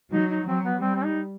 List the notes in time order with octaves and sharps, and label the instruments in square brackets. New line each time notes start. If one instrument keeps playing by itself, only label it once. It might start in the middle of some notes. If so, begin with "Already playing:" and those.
[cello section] F#3 [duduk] D#4
[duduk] D#4
[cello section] F#3 [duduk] C4
[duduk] B3
[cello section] G3 [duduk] C4
[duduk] C4
D#4